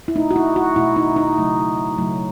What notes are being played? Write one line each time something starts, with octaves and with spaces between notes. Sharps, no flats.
E4
B2 A3 D#4
F#4
E4
F#4
B2 A3 E4
D#4
D#4
C#3 F#3 A3
C#3 F#3 A3